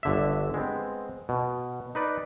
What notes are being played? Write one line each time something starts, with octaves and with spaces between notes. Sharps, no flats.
G1 D3 E5
G#3 B3 C4
B2
D#4 B4 D5